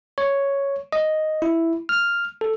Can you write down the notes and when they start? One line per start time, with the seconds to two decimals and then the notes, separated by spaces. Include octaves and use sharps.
0.18 C#5
0.92 D#5
1.42 E4
1.89 F6
2.41 A4